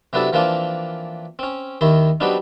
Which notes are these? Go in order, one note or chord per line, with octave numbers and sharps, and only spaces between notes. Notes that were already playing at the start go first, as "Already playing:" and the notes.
C3 F#3 B3 D4 E4 A4
E3 F3 A#3 C4 D4 F4
C4 C#4
D#2 D#3 E4 C6
F#3 G3 B3 C4 D4 D#4